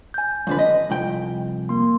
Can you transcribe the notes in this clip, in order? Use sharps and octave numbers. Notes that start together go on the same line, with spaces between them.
G#5 G6
F2 D3 B4
D#5
C2 F2 G5
A#3 C6